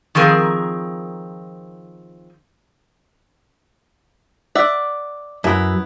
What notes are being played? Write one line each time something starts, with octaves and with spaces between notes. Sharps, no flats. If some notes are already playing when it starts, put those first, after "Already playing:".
D#3 F3 C4 G#4 A#4
D5 E5 F#5
F#2 B3 E4